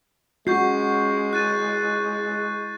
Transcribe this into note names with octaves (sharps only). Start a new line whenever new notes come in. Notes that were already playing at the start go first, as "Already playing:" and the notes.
G#3 C#4 F#4 C#6 G6 C7
E4 F#6 A6 D#7